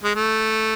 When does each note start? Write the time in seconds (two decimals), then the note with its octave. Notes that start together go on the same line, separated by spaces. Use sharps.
0.04 G#3
0.15 A3